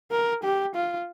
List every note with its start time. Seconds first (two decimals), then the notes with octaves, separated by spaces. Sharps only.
0.11 A#4
0.43 G4
0.75 F4